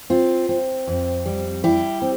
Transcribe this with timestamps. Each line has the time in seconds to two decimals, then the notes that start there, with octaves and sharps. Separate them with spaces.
0.10 C4 F4
0.49 C4
0.88 F2
1.26 G3
1.64 G3 E4 G4
2.02 C4